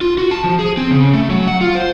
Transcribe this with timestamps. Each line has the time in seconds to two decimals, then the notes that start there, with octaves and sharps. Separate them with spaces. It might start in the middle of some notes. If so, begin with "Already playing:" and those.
0.01 F4
0.18 F#4
0.31 A5
0.44 F3
0.59 G#4
0.77 C4
0.91 C#3
1.14 A3
1.30 F#3
1.48 F#5
1.61 F4
1.75 C5